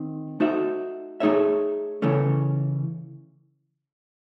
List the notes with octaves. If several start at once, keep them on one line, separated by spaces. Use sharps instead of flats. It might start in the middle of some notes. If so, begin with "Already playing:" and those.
Already playing: D#3 C4
A3 D#4 F#4 C5 E5
A3 D#4 G#4 C#5 E5
C#3 E3 A3 C#4